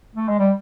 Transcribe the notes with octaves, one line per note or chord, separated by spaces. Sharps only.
A3
G#3
G3